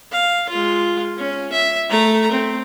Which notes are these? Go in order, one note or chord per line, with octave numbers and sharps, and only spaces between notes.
F5
G#3 F4
C#4
E5
A3 A#5
C4